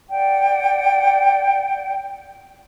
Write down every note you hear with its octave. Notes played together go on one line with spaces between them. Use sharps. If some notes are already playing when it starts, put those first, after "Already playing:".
D5 F#5 G5